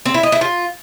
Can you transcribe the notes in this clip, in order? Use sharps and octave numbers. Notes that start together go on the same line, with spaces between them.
C4
E4
D#5
E4
F4